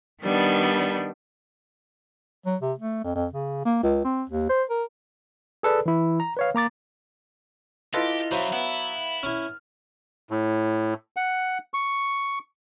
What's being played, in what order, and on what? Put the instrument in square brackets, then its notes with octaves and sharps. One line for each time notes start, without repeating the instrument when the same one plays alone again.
[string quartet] D#3 G3 B3 D4
[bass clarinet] F#3
C3
A3
F2
F2
C#3
A#3
C#2
C4
D#2
C5
A#4
[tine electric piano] G#4 A4 B4 D5
E3 E4
A#5
B4 C#5 F5
A#3 A#5 D6 A6
[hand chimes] E4 D#5 A#6 [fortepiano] F4 A4 B4 [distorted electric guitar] G4
[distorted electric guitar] F#2 [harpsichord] F#3 [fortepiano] C5 [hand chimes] E5 F5 B5
[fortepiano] B3 [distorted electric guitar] E4
[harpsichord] C#4 E4 [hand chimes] F6
[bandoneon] A2
F#5
C#6